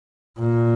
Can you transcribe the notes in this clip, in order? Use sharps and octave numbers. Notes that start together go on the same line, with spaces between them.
A#2